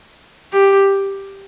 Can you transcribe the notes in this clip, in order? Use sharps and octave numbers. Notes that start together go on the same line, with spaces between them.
G4